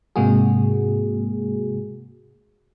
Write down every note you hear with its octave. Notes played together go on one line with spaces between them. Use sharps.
G#2 C3 G#3 A#3 F#4 G#4